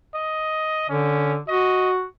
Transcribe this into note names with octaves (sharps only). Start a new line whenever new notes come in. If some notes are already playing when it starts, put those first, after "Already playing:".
D#5
D3 C#4
F#4 D#5